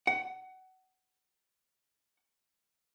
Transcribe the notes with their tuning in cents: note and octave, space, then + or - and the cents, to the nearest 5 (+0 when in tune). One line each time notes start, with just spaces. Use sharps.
F#5 +20